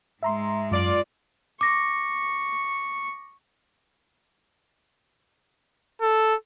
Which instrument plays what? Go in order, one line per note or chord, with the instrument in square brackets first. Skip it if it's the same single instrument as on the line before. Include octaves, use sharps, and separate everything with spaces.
[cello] G#2 G#3 [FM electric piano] E5 A#5 C6
[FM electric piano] F#2 [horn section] F4 D5
[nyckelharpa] C#6 [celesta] D6 A#6
[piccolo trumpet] A4